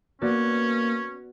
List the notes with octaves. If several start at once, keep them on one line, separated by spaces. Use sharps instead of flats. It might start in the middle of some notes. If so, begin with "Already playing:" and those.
A#3 B3 C#4 F#4 D5